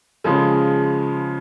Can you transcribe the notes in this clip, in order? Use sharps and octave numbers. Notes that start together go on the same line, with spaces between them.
C#3 F3 G#3